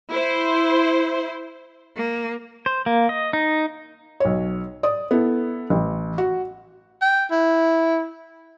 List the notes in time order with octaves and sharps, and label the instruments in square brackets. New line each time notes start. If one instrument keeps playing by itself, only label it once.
[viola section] E4 C5
[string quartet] A#3
[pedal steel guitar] C5
A#3
D#5
D#4
[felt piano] B1 C#5
D5 D#6
B3 E4 A4
A1
F#4
[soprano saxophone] G5
E4